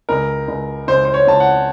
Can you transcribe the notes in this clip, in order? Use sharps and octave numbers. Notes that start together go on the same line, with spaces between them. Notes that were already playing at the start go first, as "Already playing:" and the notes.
C#2 A#4
C#2
C#2 C5
C5
C#5
C#2 A5
F#5